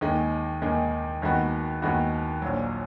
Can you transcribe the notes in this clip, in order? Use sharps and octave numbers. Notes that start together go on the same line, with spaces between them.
D#2 D#3 G#3 D#4 G#4
D#2 D#3 G#3 D#4 G#4
D#2 D#3 G#3 B3 F#4
D#2 D#3 G#3 B3 F#4
A#1 A#2 F#3